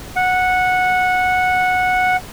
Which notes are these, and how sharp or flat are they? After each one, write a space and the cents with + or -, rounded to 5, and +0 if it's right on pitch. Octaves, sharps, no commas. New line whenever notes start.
F#5 -10